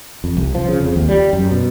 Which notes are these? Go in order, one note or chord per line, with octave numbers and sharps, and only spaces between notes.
F2
C2
F3
C#3
F2
D#2
G3
F#2
B2